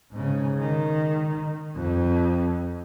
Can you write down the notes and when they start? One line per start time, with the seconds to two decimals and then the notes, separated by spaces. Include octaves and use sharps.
0.11 G#2 C#3
0.58 D#3
1.75 F2